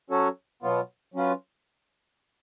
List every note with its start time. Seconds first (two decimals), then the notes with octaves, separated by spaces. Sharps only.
0.10 F#3 C#4 F#4 A4 C#5
0.63 B2 F#3 B3 F4
1.14 F#3 C#4 F4 B4